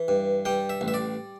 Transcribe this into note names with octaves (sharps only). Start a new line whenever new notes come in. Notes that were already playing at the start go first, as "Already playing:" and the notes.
Already playing: E3
G2
G3 G5
E5
A1
E5
D5